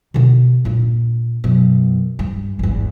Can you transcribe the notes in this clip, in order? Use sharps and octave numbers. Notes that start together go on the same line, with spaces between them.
B2 D3
A#2 D4
F#2 B2
G2
G#1 E2